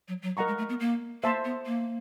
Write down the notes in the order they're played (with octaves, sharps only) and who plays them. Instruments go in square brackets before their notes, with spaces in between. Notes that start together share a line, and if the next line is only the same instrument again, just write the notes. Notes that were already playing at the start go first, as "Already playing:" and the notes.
[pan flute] F#3
F#3
[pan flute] G3 [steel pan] A#4 D#5 F#5 A#5 C#6
[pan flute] G#3
A3
B3
A#3
[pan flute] A#3 [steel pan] C5 E5 A5 C6
[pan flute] B3
A#3